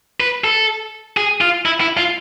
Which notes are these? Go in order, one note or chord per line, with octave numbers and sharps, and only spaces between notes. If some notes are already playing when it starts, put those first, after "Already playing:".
B4
A4
G#4
F4
E4
E4
F4